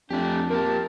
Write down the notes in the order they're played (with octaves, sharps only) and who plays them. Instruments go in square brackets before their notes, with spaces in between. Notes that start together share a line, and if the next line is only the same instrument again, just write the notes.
[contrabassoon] F2 [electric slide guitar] A3 G4 [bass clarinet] D4
[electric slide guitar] F3 A#3 [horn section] G4 A#4 A5